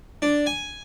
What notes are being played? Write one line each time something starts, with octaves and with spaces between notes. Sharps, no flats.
D4
G#5